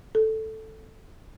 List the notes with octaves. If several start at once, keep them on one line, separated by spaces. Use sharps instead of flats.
A4